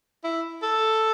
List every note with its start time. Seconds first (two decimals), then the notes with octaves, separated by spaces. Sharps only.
0.24 E4
0.63 A4